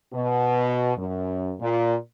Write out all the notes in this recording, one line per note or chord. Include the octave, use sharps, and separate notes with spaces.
B2
F#2
A#2